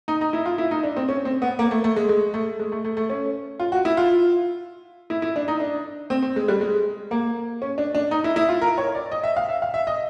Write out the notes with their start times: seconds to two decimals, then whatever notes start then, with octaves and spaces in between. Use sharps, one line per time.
0.08 D#4
0.21 D#4
0.33 E4
0.46 F4
0.58 E4
0.71 D#4
0.83 D4
0.96 C4
1.09 C#4
1.25 C4
1.42 B3
1.59 A#3
1.71 A3
1.84 A3
1.96 G#3
2.09 G#3
2.34 A3
2.60 G#3
2.72 A3
2.85 A3
2.97 A3
3.10 C#4
3.60 F4
3.72 F#4
3.85 E4
3.97 F4
5.10 E4
5.22 E4
5.36 D4
5.48 D#4
5.60 D4
6.10 C4
6.22 C4
6.36 G#3
6.48 G3
6.61 G#3
7.11 A#3
7.62 C#4
7.78 D4
7.95 D4
8.11 D#4
8.24 E4
8.36 E4
8.49 F4
8.61 A#4
8.78 C#5
8.95 D5
9.12 D#5
9.24 E5
9.36 F5
9.49 E5
9.62 F5
9.74 E5
9.87 D#5